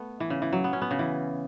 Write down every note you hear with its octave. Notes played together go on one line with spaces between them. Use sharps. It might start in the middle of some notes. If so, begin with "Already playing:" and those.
Already playing: A3 B3
E3
C#3
E3
F#3
B3
C#4
B3
C#3
E3